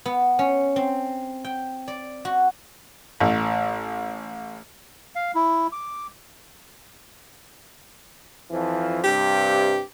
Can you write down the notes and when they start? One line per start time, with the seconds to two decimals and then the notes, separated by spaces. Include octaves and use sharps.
0.06 B3
0.39 C#4
0.76 C4
1.45 G5
1.88 D5
2.25 F#4
3.20 A1
5.15 F5
5.35 E4
5.72 D6
8.50 F2 E3 F3
9.04 G2 C3 G4